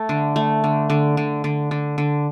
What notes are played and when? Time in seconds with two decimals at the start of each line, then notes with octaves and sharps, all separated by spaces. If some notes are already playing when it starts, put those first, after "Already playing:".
Already playing: A3
0.09 D3
0.36 A3
0.64 D3
0.90 D3
1.17 D3
1.44 D3
1.71 D3
1.98 D3